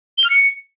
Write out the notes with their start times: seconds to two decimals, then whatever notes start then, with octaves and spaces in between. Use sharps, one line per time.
0.18 G7
0.24 F6
0.30 C#7